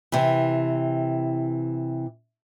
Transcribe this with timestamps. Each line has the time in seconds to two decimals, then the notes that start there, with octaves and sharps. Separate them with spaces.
0.12 C3 E3